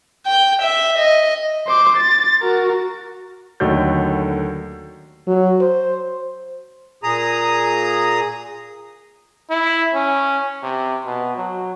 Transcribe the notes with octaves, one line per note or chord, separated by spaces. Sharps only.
G5
E5
D#5
C5 D6
A6
F#4 A#4
D#2 D3 F#3 A3 D5 G6
F#3
C5
A#2 G#4 A#5 D#6
E4
C#4
C3
B2
F#3